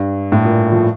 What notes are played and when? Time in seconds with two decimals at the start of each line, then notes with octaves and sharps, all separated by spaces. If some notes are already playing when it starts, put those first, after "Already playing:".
Already playing: G2
0.32 A2
0.45 A#2
0.72 F3